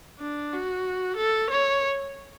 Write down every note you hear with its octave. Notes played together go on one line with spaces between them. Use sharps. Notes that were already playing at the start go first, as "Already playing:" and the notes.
D4
F#4
A4
C#5